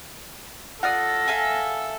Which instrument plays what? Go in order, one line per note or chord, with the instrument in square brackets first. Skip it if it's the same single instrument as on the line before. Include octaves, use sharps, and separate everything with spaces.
[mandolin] F4 D5 D#6 [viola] A4 [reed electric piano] F#5 [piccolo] A#6
[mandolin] E5 F5 G#5